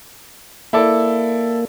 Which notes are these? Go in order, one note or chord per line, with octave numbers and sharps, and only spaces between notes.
A#3 E4 A4 D5